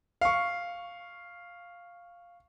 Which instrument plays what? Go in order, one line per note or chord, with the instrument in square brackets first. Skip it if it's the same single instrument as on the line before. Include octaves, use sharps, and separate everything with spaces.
[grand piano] F5 C#6